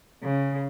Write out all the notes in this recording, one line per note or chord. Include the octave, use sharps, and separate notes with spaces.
C#3